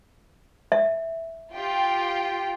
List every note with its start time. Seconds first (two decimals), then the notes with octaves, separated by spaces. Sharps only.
0.72 E5
1.53 F4 G4 G5